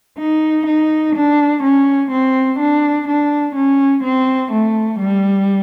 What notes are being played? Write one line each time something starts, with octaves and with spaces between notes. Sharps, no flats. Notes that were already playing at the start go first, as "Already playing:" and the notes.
D#4
D#4
D4
C#4
C4
D4
D4
C#4
C4
A3
G3